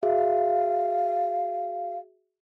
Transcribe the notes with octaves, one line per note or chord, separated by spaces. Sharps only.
F#4 G#4 E5 F5